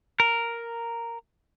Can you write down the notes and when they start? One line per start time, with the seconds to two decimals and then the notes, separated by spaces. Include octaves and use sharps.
0.20 A#4